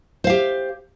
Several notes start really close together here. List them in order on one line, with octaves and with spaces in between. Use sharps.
C5 F5 G4